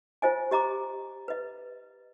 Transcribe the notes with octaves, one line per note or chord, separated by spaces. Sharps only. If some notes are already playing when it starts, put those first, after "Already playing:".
F4 C5 D#5 G#5
G4 D#5 A#5 D6
B4 D#5